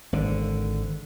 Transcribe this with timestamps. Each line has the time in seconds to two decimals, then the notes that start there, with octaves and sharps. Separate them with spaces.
0.13 G#1 D3